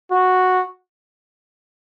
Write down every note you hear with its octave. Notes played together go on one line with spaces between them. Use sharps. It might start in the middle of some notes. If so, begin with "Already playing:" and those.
F#4